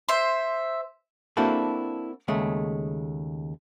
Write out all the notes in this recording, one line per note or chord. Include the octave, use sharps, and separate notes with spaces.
C5 E5
A#3 C4 D4 E4 F#4 A4
D#2 C#3 G#3 A3